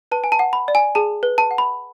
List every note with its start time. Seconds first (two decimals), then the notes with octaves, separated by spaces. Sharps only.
0.12 B4 A5
0.24 G#5
0.32 A5
0.39 F#5
0.53 B5
0.68 D5
0.75 G#5
0.95 G#4 A5
1.23 B4
1.38 A5
1.51 F#5
1.58 B5